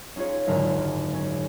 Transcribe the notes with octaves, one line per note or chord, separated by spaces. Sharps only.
C#4 D#4 F4 G#4 C#5
F#1 D#2 G#2 D3 G#3 A#4
C#4